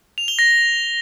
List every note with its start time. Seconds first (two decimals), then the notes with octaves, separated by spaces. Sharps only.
0.18 F7
0.28 G7
0.39 A#6